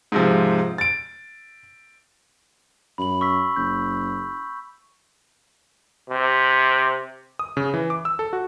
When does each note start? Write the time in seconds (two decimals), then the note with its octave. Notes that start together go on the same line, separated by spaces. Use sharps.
0.12 G#2 C3 F3
0.78 A6 D7
2.98 F#2 B5 F#7
3.21 C#6 E6 B6
3.56 F#1 G6
6.10 C3
7.39 D#6
7.57 C#3
7.74 E3
7.90 D6
8.05 E6
8.19 A4
8.33 F#4